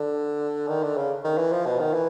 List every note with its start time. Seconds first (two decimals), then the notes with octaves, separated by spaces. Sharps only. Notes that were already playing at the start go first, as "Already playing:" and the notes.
Already playing: D3
0.69 D#3
0.83 D3
0.97 C#3
1.25 D#3
1.38 E3
1.52 F3
1.66 B2
1.80 D#3
1.94 E3